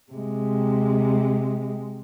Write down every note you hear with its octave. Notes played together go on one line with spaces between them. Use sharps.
C3 G#3